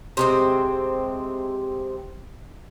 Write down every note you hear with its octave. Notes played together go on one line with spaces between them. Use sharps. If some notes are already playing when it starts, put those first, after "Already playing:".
C3 G#3 C4